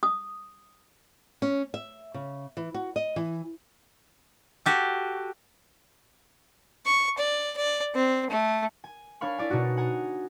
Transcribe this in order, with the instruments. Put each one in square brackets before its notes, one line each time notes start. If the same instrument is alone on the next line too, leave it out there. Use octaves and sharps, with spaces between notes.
[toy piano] D#6
[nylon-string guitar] C#4
E5
C#3
E3
F#4
D#5
E3
[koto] F#4 G4 A4
[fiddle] C#6
D5
D5
C4
A3
[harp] G#5
D4 C#5 F5 B5 C#6
E4 D5 G#5
B2 D4 D#4 F#4
F#5 G#5 A#5